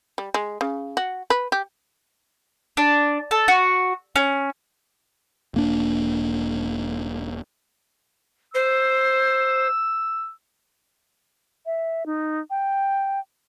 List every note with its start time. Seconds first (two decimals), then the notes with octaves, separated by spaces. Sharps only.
0.18 G3
0.34 G#3
0.61 C#3
0.97 F#4
1.30 B4
1.52 G4
2.77 D4
3.31 A4
3.48 F#4
4.16 C#4
5.54 E1 A#3 D4
8.54 C5 E6
11.66 E5
12.06 D#4
12.50 G5